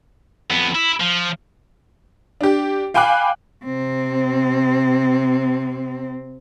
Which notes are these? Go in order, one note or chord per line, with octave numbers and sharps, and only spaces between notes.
F2 B3
E4
F3
D4 G4
F5 G5 G#5 B5 D6 F#6
C3 C4